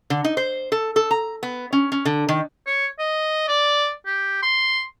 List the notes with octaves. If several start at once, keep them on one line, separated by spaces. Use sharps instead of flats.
D3
D#4
C5
A4
A4
A#5
B3
C#4
C#4
D3
D#3
C#5
D#5
D5
G4
C6